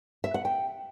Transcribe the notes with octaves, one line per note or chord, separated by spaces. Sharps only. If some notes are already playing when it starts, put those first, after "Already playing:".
E5
F#5
G5